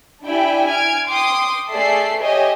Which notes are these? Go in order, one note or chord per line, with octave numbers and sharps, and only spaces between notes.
D4 E4 G4 D5 G5 G#5
G#5 F6 G#6 D7
G5 C6 D6 D#6
A3 G#4 A4 D5 E5 C7
G4 C#5 D#5 E5 G#5